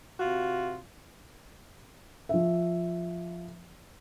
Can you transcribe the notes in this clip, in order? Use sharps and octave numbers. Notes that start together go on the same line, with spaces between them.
C3 F4 F#4
F3 E5